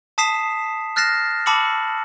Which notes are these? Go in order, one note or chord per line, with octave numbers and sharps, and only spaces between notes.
A5 D#6 B6 C7 E7
F6 F#6 A6 A#6 C7 E7
A5 B5 D6 E6 C#7 F#7